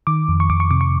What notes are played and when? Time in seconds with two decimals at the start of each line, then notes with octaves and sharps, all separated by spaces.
0.07 D#3 D6
0.29 F2
0.40 C#6
0.50 F2 D6
0.60 C#6
0.71 C3 D6
0.81 C#6